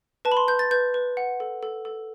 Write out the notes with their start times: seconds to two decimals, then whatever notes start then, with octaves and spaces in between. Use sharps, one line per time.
0.25 B4 A5
0.32 B5
0.37 C6
0.48 B4 G6
0.59 A6
0.71 B4 G6
0.94 B4
1.17 F#5
1.40 A4
1.63 A4
1.85 A4